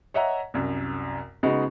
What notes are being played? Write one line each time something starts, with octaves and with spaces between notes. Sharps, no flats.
C#5 D#5 E5 F#5 A#5
C2 F#2
C#3 G#3 B3 D#4 F#4